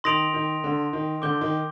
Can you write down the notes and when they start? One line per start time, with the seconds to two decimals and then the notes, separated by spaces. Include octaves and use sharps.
0.04 D#3 C6 D#6 A#6 D7 F7
0.34 D#3
0.64 D3
0.93 D#3
1.22 D3 D6 G6 D7 G7
1.41 D#3